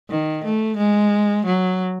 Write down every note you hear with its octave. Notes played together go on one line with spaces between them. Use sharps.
D#3
A3
G#3
F#3